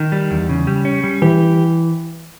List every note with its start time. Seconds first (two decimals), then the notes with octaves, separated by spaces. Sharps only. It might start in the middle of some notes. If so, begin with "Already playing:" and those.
Already playing: D#3
0.12 G3
0.30 E2
0.49 C#3
0.67 G3
0.85 C#4
1.04 G3
1.22 E3 G4